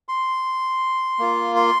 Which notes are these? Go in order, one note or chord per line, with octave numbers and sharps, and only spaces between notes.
C6
A#3 F4
C6